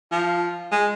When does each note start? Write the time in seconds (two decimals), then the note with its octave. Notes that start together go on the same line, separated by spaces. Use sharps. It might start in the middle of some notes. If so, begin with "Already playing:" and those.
0.11 F3
0.72 G#3